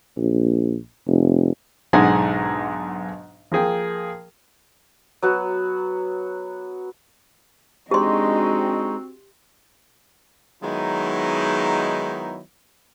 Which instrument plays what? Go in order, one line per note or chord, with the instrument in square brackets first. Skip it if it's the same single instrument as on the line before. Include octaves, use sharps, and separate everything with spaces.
[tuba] A#1
F1
[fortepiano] B1 G#2 D3 G#3 F#5 G#5
F3 A#3 G#4 G5
[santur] F#3 B3 F#4
[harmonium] G#3 D#4 [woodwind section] C4 F#4 [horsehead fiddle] D4 D#5 [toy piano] G4 C6
[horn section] D#3 F#3 G#3 B3 D#4 E4